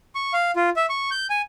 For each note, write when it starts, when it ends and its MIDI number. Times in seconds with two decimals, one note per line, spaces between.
0.15 0.33 85
0.33 0.51 77
0.56 0.70 65
0.76 0.86 76
0.89 1.10 85
1.11 1.27 91
1.30 1.42 80